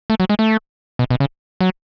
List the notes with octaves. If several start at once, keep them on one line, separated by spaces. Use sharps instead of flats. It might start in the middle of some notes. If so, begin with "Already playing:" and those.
A3
F#3
G#3
A3
B2
B2
C#3
F#3